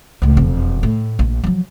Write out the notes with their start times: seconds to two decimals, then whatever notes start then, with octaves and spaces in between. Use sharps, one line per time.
0.22 C#2 A2
0.37 E1 F2
0.83 A2
1.19 A#1
1.44 F3 F#3